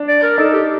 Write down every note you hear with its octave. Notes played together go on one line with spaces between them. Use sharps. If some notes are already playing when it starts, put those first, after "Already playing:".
Already playing: D4
D5
A#4
D#4 A4
G4